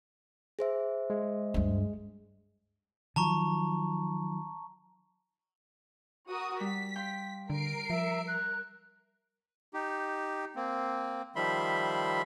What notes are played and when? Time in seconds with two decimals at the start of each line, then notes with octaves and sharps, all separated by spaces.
0.59 G#4 C5 E5
1.10 G#3
1.54 D2 G2
3.16 D#3 F3 F#3 A5 A#5 C#6
6.29 F#4 A#4 D#6
6.60 G3 B6
6.96 F5 G5 C6
7.50 D3 A#4 C7 D7
7.90 F3 E5
8.28 A#4 F#6
9.74 D#4 G4
10.56 A#3 C4
11.36 D#3 F3 G3 E5 B5 C6